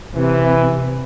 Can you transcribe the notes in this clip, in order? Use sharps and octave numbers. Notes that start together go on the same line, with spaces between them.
C3 E3